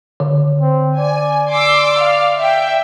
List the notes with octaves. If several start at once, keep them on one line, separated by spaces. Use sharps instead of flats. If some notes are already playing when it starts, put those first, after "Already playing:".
D3
C4
D5 G#5
C6 D6 E6
F5
E5 G5